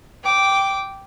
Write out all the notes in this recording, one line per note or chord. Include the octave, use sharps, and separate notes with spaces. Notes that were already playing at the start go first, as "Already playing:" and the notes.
G5 D6